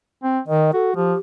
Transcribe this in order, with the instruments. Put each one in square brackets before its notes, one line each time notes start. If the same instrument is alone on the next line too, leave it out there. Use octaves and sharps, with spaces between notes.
[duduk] C4
[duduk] D#3 [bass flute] D#5
[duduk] F#4 [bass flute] A4
[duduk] F3 [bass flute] G4